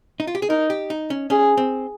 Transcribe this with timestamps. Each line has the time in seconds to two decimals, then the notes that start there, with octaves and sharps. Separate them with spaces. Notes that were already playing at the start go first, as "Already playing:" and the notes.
0.20 D#4
0.27 F4
0.35 G4
0.42 G#4
0.49 D#4 A#4
0.70 G4
0.90 D#4
1.10 C#4
1.30 C#4 G#4
1.57 C4